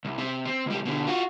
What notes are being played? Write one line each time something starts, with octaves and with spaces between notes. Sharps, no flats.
C2
C3
C4
C#2 G3
B2 D3
F4 F#4